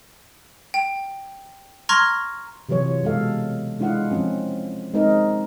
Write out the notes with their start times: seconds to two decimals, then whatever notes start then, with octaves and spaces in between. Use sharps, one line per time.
0.74 G5
1.89 A#5 C6 C#6 F6 G#6 A#6
2.69 C3 E3 F#3 F4 C#5
3.03 B2 G#3 A4 F5
3.80 G#3 D4 E4 F4 F5 F#5
4.11 F3 C4 C#4
4.94 G#3 C4 D#4 A#4